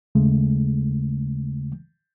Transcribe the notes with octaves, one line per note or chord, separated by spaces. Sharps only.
D#2 C#3 G#3 A3